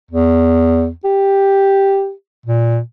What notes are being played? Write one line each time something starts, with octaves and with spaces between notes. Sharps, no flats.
E2
G4
A#2